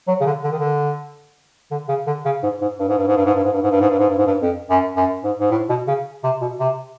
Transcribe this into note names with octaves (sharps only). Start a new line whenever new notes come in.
F#3
C#3
D3
D3
D#3
D3
D3
C#3
D3
C#3
G#2
G#2
G2
G#2
G2
G#2
G2
G#2
G2
G#2
G2
G#2
G2
G#2
G2
G#2
G2
G#2
G2
F2
F#2
F#2
G#2
G#2
A2
B2
C#3
C3
B2
C3